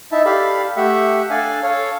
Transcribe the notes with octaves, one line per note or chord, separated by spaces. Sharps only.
D#4 E4 E5 A5
G4 A4 D5 F5 B5
A3 G4 E5 F#5
D4 A4 D5 F5 G#5
A4 C#5 F5